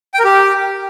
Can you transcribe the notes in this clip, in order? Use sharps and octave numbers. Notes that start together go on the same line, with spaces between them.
G5
A#4
G4